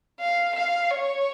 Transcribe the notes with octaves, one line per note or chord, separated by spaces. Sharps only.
F5
F5
C#5